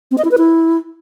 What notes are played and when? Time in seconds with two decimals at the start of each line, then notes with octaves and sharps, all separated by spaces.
0.11 C4
0.18 D#5
0.25 E4
0.31 B4
0.38 E4